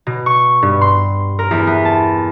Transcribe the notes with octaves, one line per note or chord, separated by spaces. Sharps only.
B2
C#6
G2
C6
A#4
E2
B3
A5